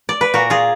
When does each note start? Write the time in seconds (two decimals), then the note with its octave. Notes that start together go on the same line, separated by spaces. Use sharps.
0.09 D5
0.21 B4
0.34 A#2 F#4 A#4
0.50 F4 G#4